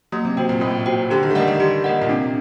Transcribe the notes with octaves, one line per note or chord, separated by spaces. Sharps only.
F#3 A#3
C3
C3 F#4 C5 G5
A#2
A2 A#3
F#4 C5 G5
D3 G4
D#3
A3
G3 A#4 D#5 F#5
D#3
G3 G4
A#3 A#4 D#5 F#5
A#2
C3 D4